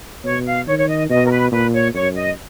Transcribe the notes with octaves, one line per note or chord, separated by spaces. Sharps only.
B2 C#5
F5
D#3 C#5
C#5
D#5
B2 D#5
A#4
B4
A#2 B4
C#5
F#2 C#5
D#5